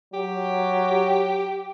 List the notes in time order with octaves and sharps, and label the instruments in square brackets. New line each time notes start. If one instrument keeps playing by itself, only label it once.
[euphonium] F#3 [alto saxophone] G4